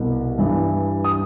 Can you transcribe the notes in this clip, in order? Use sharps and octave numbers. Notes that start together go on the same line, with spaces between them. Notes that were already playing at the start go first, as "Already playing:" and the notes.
Already playing: C2 B2
G2 E3
D#6